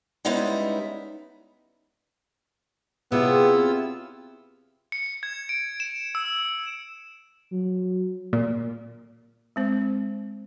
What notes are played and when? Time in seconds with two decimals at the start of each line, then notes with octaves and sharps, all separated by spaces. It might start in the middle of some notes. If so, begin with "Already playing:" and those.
0.25 G3 G#3 B3 C#4 D#4 E4
3.12 C3 B3 E4 F4 G#4 C#5 D5 E6
4.92 C#7
5.06 C#7
5.23 G#6
5.49 D7
5.80 E7
6.15 E6
7.52 F#3
8.33 A#2 A#3
9.56 G#3 C4 C5